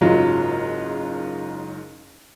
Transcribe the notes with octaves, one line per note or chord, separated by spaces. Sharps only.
F#1 G#2 F#3 F4